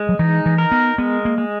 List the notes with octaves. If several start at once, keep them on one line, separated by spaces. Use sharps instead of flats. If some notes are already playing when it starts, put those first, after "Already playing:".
Already playing: G#3
F#3
E3 D#4
E3
A#4
B3
G#3 B3
A#3
G#3